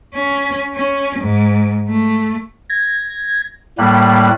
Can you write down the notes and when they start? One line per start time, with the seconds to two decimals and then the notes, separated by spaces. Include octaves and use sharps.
0.14 C#4
0.75 C#4
1.19 G#2
1.89 A3
2.69 G#6 A#6
3.78 A2 G3 A#3 F#6